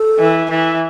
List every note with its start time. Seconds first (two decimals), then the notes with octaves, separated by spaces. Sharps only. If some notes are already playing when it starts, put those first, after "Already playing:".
Already playing: A4
0.19 E3
0.50 E3